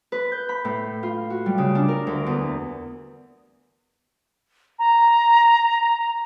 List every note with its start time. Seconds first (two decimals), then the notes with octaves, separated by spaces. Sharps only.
0.12 B4
0.32 G6
0.49 B5
0.65 A2
1.03 F4
1.30 F#4
1.46 G3
1.58 C#3
1.75 D4
1.88 A#4
2.07 D2
2.26 E2
4.79 A#5